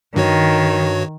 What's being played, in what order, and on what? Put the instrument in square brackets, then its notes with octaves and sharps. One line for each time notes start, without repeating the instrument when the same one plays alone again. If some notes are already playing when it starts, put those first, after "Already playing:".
[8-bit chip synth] G2 F#4 C#5 [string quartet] D#3